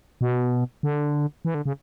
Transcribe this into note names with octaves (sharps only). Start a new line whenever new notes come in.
B2
D3
E3
D3
C#3